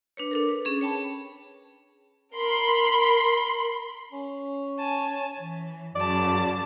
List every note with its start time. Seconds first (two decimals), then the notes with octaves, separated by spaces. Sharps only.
0.17 D4 B4 C#5
0.31 D4 A4 A#4
0.49 B4
0.65 C#4 G#4
0.81 C#5 G5 A5 B5
2.36 A#4 B5 C6
4.12 C#4
4.78 G#5 A5
5.38 E3
5.96 F#2 C#3 D5 A5